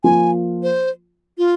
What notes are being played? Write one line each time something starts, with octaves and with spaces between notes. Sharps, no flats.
F3 A#3 F4 G#5
C5
F4